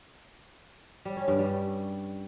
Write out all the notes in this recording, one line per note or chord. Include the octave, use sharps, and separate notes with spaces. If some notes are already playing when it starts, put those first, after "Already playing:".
G3
C#4
G2
G3